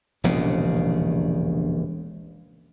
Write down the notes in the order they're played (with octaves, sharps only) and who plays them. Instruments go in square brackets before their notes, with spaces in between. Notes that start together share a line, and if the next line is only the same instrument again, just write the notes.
[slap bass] E1 A#1 D#2 C#3